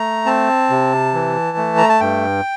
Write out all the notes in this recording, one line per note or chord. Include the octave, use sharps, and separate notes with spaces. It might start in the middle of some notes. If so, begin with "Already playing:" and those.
Already playing: A3 A#5
C4 A5
C3
E3
A3
A#5
A5
G2 G5